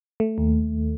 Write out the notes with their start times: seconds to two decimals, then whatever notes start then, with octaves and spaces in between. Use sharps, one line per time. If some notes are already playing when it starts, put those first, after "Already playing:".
0.20 A3
0.38 D#2